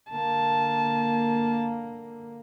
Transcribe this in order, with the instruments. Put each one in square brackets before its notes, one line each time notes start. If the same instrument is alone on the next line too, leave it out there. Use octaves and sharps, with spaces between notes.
[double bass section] D3 A#3 [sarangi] A5